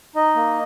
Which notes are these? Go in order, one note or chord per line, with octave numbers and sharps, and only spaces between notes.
D#4 D#5
A#3